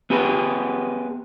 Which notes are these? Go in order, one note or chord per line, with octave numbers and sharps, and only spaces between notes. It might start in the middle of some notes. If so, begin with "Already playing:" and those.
B3 G4 G#4 B4